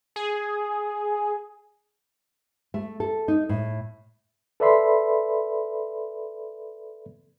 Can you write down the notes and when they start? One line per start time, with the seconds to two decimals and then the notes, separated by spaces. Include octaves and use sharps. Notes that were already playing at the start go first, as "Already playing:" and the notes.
0.16 G#4
2.74 A3
3.00 A4
3.28 D#4
3.49 A2
4.60 A4 B4 D5 E5 B5 C6